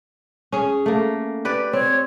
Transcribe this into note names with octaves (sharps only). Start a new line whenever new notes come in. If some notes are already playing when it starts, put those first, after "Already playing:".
C#4 G#4
A3 A#3
G4 B4 D5
C4 C#5